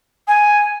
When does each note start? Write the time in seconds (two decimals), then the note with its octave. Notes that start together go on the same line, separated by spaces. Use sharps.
0.27 G#5